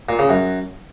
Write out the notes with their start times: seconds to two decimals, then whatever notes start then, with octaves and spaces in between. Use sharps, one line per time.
0.09 A#2
0.19 C#3
0.30 F#2